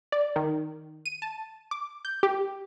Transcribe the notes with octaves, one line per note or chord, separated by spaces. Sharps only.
D5
D#3
D#7
A5
D6
G6
G4